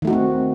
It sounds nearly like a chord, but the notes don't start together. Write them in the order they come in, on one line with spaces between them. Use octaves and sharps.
D#3 A3 F#4 D#4 C4